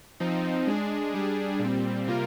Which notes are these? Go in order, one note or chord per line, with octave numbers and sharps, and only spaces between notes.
F3 C4 D#4
G#3 D4 G#4
G3 D4 G#4
A#2 G3 C4
C3 G3 A#3 F4 A#4